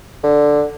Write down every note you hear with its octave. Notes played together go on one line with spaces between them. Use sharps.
D3